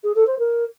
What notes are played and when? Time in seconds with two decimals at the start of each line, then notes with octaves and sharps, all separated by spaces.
0.04 G#4
0.16 A4
0.27 C5
0.39 A#4